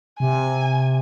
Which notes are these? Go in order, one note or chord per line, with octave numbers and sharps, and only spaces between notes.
C3 G#5